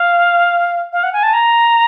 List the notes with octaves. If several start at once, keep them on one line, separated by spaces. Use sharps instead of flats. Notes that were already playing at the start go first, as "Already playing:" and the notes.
Already playing: F5
F5
F#5
G#5
A5
A#5